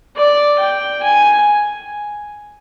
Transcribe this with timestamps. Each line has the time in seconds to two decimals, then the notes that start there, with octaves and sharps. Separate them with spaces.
0.17 D5
0.60 G5
1.03 G#5